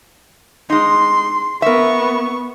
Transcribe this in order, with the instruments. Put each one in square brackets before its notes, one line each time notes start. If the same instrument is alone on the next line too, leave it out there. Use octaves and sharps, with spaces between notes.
[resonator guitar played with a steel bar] G#3 D#4 [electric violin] C6
[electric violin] B3 C#6 [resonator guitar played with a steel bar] A#4 E5